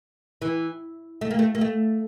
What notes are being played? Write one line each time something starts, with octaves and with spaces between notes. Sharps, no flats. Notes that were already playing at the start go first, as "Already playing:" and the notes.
E3
A3
A#3
A3
A#3
A3